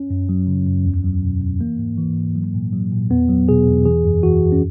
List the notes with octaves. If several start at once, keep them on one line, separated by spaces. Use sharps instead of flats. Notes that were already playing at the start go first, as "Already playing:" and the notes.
Already playing: C#4
F#2
F#3
C#3
F#2
E2
F#3
B2
E2
E3 A#3
G#2
E3
G#2
F#3
A#2
F#3
A#2
E2 B3
F#3
B2 G#4
E2
E3 G#4
F#2
E3 F#4
F#2
C#4